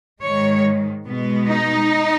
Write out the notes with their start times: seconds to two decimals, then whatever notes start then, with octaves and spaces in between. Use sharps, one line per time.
0.21 G#2 D#3 G#3 C#5
1.06 B2 G#3 B3
1.48 D#4